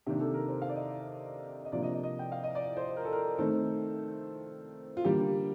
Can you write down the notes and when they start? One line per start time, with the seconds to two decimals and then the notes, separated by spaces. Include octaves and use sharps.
0.06 C3 D#3 A#3 D4 G4
0.20 A4
0.34 A#4
0.48 C5
0.62 F5
0.69 D5
0.76 D#5
1.65 D#5
1.72 C3 F3 A#3 D4 D5
1.83 D#5
1.93 D#5
2.04 D#5
2.19 G5
2.32 F5
2.44 D#5
2.55 D5
2.77 C5
2.97 A#4
3.05 A4
3.13 A#4
3.38 D#3 A3 C4 A4
4.97 F4
5.04 D3 G3 A#3 G4